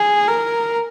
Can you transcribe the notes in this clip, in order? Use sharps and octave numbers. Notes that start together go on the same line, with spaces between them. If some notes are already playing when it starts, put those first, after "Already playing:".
Already playing: G#4
A#4